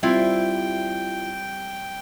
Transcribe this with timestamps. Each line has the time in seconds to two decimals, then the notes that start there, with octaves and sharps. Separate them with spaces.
0.03 G3 C4 E4 F4 E5 G5